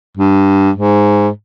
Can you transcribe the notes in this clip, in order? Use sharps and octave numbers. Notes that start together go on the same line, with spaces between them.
G2
G#2